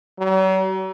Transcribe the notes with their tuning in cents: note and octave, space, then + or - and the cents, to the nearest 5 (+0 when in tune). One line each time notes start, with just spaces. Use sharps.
F#3 +45